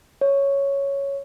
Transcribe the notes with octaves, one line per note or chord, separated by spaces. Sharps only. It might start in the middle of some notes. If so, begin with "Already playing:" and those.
C#5